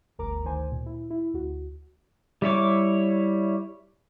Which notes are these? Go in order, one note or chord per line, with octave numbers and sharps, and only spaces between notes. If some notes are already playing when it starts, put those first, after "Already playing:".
G1 D2 A#4 A#5 D6
D2 D#3 C5 G#5
A#2
E4
E4
D2 F#4
G3 E4 C#5 D6